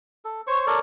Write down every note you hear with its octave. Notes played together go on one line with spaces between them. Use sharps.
A4
C5 C#5 C#6
A4 A#4 C#5 D5